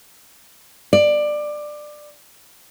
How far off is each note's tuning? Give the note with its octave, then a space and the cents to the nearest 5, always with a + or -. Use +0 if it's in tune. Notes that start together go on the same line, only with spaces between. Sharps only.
D5 +15